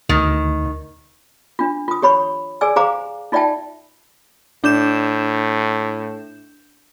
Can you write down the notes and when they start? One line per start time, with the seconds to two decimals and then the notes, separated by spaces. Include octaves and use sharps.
0.09 D2 D#3
1.59 D4 F4
1.88 F4 D#6
2.02 G4 C#5 B5 C#6
2.61 G#4 D5 G#5 E6
2.76 G4 G#4 C5 F5 A#5 D6
3.32 D#4 F4 D5 E5 G5 A5
4.64 A2 D4 G6 E7